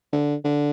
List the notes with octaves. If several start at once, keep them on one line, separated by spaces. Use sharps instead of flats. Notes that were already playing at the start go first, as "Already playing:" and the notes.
D3
D3